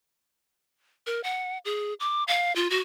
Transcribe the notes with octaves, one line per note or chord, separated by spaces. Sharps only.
A#4
F#5
G#4
D6
F5
F4
F#4